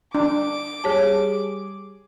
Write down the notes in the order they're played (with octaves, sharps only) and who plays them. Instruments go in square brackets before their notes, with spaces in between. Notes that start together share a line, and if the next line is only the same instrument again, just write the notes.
[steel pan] D4 [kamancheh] D6
[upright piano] G3 G#4 [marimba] G4 C#5 A5